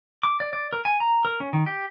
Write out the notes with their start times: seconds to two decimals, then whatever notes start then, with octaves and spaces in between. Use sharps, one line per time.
0.23 D6
0.40 D5
0.53 D5
0.73 A#4
0.85 G#5
1.00 A#5
1.25 A#4
1.40 C#4
1.53 D#3
1.66 G4